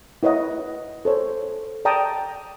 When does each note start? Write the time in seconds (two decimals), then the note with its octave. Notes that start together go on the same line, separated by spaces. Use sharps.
0.23 E4 B4 C#5 D#5 F#5
1.05 A4 C5 C#5
1.85 D5 G5 A5 A#5 D#6